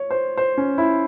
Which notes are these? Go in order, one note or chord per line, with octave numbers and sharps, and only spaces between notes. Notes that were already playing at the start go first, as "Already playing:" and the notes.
Already playing: C#5
C5
C5
C#4
E4